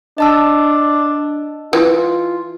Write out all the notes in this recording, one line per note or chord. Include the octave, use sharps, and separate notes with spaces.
D4 D#5 A5 E6
E3 F4